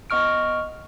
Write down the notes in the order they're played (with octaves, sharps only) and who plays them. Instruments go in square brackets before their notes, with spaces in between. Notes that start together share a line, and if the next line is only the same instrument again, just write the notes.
[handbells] B3 D#5 C#6 F6 D7